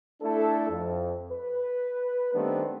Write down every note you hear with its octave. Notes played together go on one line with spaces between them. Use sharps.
A3 D4 E4 A4
F2
B4
D#3 G3 A3 B3 C4 D4